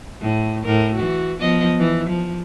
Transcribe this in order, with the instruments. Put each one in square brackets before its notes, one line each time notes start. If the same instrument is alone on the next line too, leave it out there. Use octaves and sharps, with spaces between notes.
[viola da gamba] A2
A2 A#4
E3 F#4
F3 B3 D#5
E3
F3